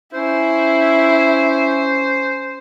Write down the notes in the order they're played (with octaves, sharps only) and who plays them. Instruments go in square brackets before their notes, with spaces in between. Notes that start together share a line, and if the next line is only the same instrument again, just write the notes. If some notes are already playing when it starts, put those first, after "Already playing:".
[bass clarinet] C#4 [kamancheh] E4 [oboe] C5